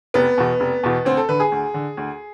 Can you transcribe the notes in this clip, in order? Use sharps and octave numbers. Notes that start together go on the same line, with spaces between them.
F1 B3
E2 B2
F1
E2 B2
D2 C4
A4
D3 B4
G#4
D2
D3
D2